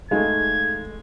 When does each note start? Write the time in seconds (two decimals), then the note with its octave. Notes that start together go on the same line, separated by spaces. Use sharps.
0.11 G#3 A3 D#4 G#4 F5 G#6